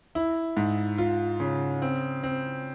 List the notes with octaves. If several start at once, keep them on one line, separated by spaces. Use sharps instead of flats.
E4
G#2
F4
C#3
C4
C4